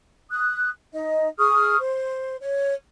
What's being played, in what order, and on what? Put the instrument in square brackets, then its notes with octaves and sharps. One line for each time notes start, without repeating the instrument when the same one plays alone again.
[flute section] D#6 F#6
D#4 D#5
G#4 C#6 D#6 F6
C5
C#5